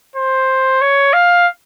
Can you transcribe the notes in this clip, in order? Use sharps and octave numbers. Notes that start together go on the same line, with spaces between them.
C5
C#5
F5